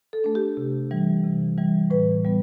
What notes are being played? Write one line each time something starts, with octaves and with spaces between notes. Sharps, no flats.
A4
A3 D4
G4
C3
E3 G3
C3
E3 G3
A2 B4
G3 B3